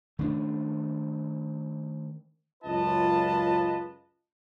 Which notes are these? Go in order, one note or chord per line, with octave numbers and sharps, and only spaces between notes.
D#3 A3 C#4 D4
C#2 F#2 F4 B4 D#5 A5